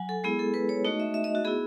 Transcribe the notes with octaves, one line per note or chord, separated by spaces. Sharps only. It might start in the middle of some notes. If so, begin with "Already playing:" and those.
Already playing: F#3 F#5 G#5
A4
G#3 B3 E4 G#4
A4
B4
C#5
A3 D#4 F#4 D#5
E5
E5
D#5
F#4
B3 E4 G#4